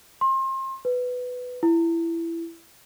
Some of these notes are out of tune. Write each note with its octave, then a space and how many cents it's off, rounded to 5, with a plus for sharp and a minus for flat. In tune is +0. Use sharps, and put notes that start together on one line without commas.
C6 +30
B4 +10
E4 +15